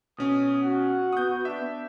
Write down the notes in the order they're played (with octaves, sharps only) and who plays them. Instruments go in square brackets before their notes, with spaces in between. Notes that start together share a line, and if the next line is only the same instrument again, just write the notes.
[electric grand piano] B2 C#4 [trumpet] D#6
[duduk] F#4 [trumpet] F#5
[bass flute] B3 [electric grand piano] D#6 G6
[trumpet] D4 [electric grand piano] E5